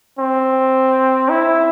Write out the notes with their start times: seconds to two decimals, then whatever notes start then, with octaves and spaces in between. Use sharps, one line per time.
0.19 C4
1.29 E4